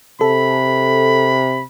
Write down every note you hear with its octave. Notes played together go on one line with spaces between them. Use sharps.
C3 A4 B5